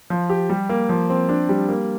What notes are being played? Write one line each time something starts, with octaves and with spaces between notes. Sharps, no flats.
F3
G4
G3
A#3
F3
C4
D4
G3
A#3